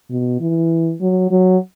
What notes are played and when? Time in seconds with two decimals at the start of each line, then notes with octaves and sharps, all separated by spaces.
0.10 B2
0.40 E3
1.01 F#3
1.30 F#3